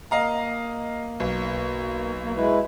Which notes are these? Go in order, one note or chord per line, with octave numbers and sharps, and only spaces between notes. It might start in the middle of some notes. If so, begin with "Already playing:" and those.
A#3 D#5 F5 A#5
B1
A#3
G#3 E4 B4